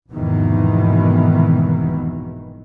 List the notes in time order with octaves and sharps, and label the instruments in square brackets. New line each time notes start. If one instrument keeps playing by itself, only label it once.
[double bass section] F1 E2 G#2 B2 D#3 E3